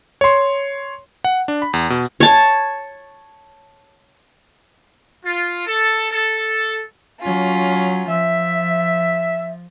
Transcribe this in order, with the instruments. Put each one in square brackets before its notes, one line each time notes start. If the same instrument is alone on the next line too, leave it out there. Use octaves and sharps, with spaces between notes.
[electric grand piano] C#5 C6
F#5
D4
B5
E2
B2
[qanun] C#5 A5
[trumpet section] F4
A4
A4
[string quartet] F#3 C#4 F4
[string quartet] F3 [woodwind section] E5